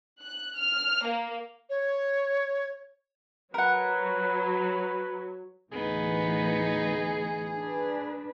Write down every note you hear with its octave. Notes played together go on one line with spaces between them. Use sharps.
F#6
F6
A#3
C#5
F#3 A#4 B4 F#5
D2 A2 E3 B3 D#4 G#4
D4 B4